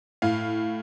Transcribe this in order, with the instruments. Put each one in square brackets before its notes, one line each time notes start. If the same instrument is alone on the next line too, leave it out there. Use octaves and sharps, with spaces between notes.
[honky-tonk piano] A2 F5